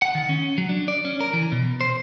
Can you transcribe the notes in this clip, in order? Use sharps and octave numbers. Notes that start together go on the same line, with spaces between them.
F#5
D#3
C#4
F#3
D4
D5
C#4
A#4
E3
B2
C5